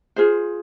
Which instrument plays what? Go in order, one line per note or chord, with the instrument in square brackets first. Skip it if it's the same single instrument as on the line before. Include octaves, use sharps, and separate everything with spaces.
[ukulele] F4 G#4 C5